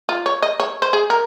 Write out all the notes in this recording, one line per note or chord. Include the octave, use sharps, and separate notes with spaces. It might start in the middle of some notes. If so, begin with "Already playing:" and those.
F4
C#5
D#5
C#5
C5
G#4
A#4